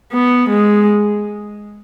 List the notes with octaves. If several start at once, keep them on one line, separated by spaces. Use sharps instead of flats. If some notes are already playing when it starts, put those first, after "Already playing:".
B3
G#3